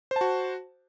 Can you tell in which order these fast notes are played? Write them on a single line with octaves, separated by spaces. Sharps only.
C5 A5 F#4